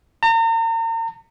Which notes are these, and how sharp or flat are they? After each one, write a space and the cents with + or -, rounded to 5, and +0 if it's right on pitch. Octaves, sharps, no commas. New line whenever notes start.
A#5 -40